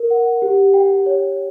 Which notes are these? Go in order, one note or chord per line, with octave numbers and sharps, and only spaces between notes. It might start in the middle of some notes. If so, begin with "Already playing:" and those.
Already playing: A#4
F#5
G4
G5
C#5